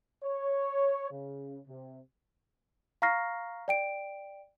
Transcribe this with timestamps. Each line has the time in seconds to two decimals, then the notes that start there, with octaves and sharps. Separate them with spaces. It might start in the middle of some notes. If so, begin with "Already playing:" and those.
0.24 C#5
1.12 C#3
1.68 C3
3.02 F5 A#5 C#6 F6 A#6 C7
3.68 D5 G5 D7